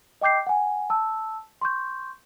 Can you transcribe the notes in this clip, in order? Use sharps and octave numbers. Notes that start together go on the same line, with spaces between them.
D#5 G5 D6 G6 C7
F#5 G#5
A5 E6
C6 C#6 G6